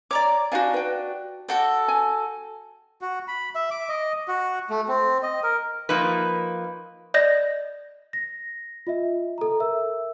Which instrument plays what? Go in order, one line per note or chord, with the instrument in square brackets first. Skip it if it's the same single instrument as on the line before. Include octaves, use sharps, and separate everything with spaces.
[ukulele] C#5 [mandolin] D5 A#5 D6
[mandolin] D4 F#4 [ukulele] D#4 F5 G#5
[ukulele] B4 G5
[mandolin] F#4 A4 G5 [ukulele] D5 F#5
[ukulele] G#5
[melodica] F#4
B5
E5
D6
D#5
F#4
A3
C4
D#5
A#4
[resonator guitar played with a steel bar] F3 A#3 D#4 B4
[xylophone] D5 D#5 G6 A#6
[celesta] A#6
F4 D#5 E5
A4 A#5
A#4 E5 E6